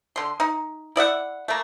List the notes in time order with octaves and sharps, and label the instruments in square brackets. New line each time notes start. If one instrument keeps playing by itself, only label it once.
[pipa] D3 C6
D#4
E4 D5 E5 F#5
A3 A#3